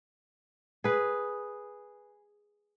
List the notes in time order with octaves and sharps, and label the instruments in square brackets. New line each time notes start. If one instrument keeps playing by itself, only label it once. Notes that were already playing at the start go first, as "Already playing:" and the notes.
[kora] G#4 B4